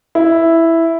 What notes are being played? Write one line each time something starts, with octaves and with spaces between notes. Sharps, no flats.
E4